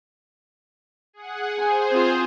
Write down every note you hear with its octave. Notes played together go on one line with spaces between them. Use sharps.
G#4 F#5
G#4 C5 G#5
C4 F4